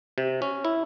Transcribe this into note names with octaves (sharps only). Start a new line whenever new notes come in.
C3
C#4
E4